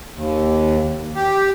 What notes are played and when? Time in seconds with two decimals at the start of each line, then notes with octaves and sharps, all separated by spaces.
0.15 D#2
1.15 G4